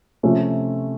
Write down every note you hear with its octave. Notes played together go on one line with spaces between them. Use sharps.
C3 F3 A3 C#4